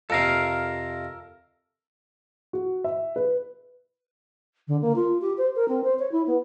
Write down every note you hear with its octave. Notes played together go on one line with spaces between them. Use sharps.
F2 C3 A4 A#4 F5
F#4
E5
B4
D3
A#3
F4
G4
C5
A#4
C4
C5
C#5
E4
B3